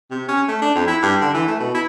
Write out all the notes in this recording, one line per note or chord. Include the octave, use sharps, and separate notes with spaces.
C3
C#4
A3
D4
F2
E4
G2
D3
E3
A3
B2
E4